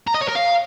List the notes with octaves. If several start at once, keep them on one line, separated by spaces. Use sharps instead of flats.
A#5
D#5
C#5
A#4
F5